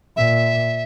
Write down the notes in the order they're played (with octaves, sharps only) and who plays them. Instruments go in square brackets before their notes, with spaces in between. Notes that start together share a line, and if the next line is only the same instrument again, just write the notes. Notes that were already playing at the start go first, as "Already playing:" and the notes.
[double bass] A#2 [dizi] E5